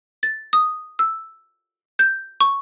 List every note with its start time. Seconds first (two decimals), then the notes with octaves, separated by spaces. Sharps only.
0.23 A6
0.53 D#6
0.99 E6
1.99 G6
2.41 C#6